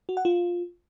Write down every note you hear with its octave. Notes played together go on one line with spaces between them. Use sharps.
F#4
F#5
F4